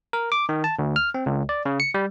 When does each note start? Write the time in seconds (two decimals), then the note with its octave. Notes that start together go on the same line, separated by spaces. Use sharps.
0.13 A#4
0.32 D6
0.49 D#3
0.64 A5
0.79 D2
0.96 F6
1.14 C4
1.26 C#2
1.49 D5
1.65 C#3
1.80 C#7
1.94 G3